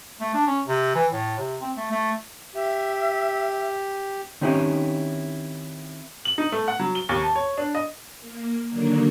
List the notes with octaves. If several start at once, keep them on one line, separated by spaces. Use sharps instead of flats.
A3
D4
C#4
C3
E3
A2
C3
C4
A3
A3
G4 E5
D#3 C4 C#4 D#4 E4 G4
F#7
D#4
A3
F#5
F#3
G7
D#2
A5
C#5
D4
D#5
A#3
D3 D#3 F#3 A#3 D4 A#4